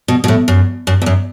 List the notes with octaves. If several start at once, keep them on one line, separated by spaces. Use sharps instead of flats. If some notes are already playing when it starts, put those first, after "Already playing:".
B2
B2
A2
F#2
F#2
E2
F#2